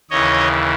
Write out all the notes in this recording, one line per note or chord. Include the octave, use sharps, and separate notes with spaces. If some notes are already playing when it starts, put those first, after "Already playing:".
D#2 C#3 E3 C#5 D#5